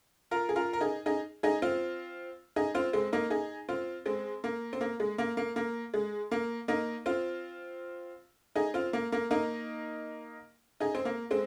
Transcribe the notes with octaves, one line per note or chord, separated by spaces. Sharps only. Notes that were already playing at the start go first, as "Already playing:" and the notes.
F4 A#4
G#4
F4 A#4
A#4
D#4 G#4
D#4 G#4
D#4 G#4
C4 F4
D#4 G#4
C4 F4
G#3 C4
A#3 D#4
D#4 G#4
C4 F4
G#3 C4
A#3
C4
A#3
G#3
A#3
A#3
A#3
G#3
A#3
A#3 D#4
C4 F4
D#4 G#4
C4 F4
A#3
A#3
A#3 D#4
D#4 G#4
C4
A#3
G#3 C4